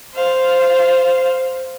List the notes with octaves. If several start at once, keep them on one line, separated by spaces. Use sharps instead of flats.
C5 F5